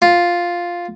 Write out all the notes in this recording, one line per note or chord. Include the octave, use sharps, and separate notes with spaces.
F4